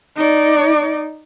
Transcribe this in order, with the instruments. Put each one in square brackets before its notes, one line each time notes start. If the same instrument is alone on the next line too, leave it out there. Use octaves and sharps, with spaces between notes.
[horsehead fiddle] D#4 D5